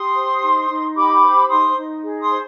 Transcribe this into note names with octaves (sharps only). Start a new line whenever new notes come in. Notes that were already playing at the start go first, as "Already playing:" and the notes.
Already playing: G4 C6 D#6
C5
D#4
D#4
G4 B5 D6
C5
D#4 C6 D#6
D#4
G#4
C6 D#6
C5